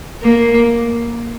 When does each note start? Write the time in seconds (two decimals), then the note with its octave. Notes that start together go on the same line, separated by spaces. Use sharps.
0.23 A#3